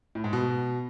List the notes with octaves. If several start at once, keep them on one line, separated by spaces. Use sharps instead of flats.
A2
G#2
B2